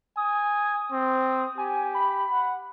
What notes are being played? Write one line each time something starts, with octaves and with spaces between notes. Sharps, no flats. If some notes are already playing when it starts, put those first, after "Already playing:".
G#5 D#6
C4
G4 G#5
B5
F#5